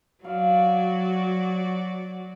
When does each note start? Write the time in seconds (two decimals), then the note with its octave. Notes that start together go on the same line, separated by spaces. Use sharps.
0.24 F#3 F#4 D5 F5